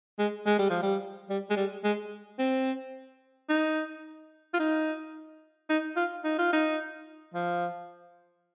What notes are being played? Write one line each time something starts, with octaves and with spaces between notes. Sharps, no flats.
G#3
G#3
G3
F3
G3
G3
G#3
G3
G#3
C4
D#4
F4
D#4
D#4
F4
D#4
F4
D#4
F3